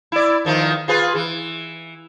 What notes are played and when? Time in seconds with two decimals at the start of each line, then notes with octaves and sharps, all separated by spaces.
0.12 E4 D5
0.45 E2 D#3 F3
0.88 F4 G#4 B4
1.15 E3